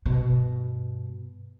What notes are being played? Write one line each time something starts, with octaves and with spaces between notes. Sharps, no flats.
G2 B2